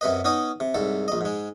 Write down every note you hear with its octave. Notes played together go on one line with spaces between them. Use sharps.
F#2 C3 B4 D#5
B3 C#4 D#4 D#5 D#6
C3
C2 G#2 A4
A#1 D#5
G#2 G#3